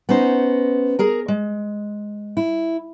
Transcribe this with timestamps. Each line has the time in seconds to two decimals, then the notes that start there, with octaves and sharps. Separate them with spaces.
0.09 B3 C#4 D#4 C5
0.99 G#4 A#4 A#5
1.28 G#3
2.37 E4